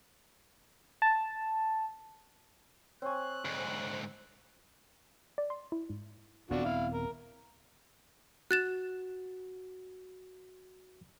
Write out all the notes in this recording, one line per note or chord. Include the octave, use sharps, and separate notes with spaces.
A5
C4 C#5 G#5 C#6 F#6
D2 G#2
D5
C6
E4
G#2
D#1 B3 C4 D4 F4 F#4
E4 F5
A#4
F#4 F#6 A6 E7